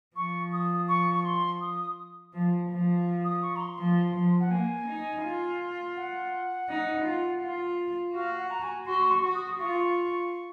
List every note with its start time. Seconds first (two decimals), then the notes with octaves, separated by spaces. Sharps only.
0.16 F3 C#6
0.53 D#6
0.88 C#6
1.15 C#6
1.25 C6
1.61 D#6
2.33 F3
2.70 F3
3.24 D#6
3.42 C#6
3.56 A#5
3.60 C6
3.78 F3
4.15 F3
4.40 F#5
4.51 A#3 G#5
4.88 D#4
5.23 F4
5.96 F#5
6.69 D#4
7.04 F4
7.42 F4
8.14 F#4 F5
8.38 F#5
8.50 A#5
8.62 G#5
8.86 F#4 C6
9.02 C6
9.11 C#6
9.22 F#4
9.35 D#6
9.59 F4 C#6